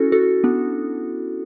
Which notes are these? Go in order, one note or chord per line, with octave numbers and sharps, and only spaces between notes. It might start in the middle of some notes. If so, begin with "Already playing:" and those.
Already playing: C#4 E4 F#4 A4
F#4 A4
B3 D4